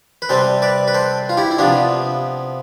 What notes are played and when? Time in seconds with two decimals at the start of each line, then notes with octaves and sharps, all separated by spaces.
0.22 B4
0.29 C3 G3 C4 A4 C5
0.62 B4 D5
0.88 B4
0.94 A4 C5
1.29 F4
1.37 E4 G4
1.51 E4
1.58 C3 F3 B3 D4 F4